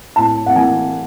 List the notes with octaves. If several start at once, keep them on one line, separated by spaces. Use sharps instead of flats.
A2 A5
F#5
E3 G#5